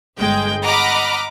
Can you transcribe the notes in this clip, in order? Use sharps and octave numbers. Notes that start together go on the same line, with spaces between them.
G1 G#3 G5
D#5 F#5 A#5 B5 D6 F6